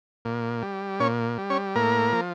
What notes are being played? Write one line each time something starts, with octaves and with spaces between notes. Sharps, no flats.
A#2
G3
A#2 C#4 C#5
G3
C#4 C#5
A2 A#3 A#4
F3